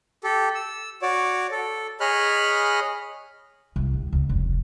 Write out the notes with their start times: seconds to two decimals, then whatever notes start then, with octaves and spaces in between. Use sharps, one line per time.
0.24 G4 A4
0.55 E6
1.02 F#4 C#5 D5
1.51 A4
2.00 G#4 C#5 D#5 B5 F6 F#6
3.76 C2
3.94 D#2
4.13 C#2
4.29 F1